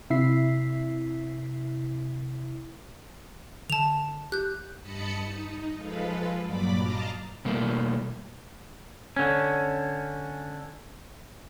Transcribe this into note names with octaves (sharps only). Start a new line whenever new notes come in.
C3 E4 E5 B6 C7
D3 A5 F7
G4 F#6 G6
G2 D#5 A5 B5 C#7
D#4
F3 G#3 F4 A4 B4
G2 A#2 F#3 D5 B5 D6
D#5 F5 A5 A#5 D6 F6
B2 G3 A3 A#3
D3 C#4